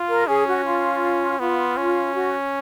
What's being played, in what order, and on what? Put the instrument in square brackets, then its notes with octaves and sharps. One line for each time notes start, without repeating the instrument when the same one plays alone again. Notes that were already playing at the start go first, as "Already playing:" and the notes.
Already playing: [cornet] F4
[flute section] A#4
[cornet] C#4 [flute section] G#4
[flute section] F#4
F4
[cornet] B3 [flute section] F4
[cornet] C#4
[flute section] F#4